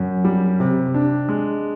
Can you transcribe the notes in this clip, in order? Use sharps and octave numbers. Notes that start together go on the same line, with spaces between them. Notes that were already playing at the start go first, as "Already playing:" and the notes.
Already playing: F#2
G3
C3
D4
G#3